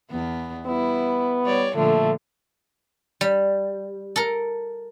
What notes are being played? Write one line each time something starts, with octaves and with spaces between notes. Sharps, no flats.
E2 B3
G3 B3 E4
G3 C#5 D5
A#2 D3 F3 A3
G3
A4 A#4